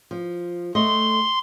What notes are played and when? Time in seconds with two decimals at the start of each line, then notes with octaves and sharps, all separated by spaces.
0.11 F3
0.75 A3 D#5 C6